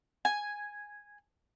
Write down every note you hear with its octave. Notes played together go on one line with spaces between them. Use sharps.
G#5